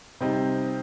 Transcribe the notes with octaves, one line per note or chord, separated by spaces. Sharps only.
C3 G3 C4 D#4